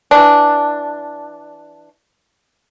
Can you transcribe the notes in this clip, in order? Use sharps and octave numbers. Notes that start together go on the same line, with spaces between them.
E3 D4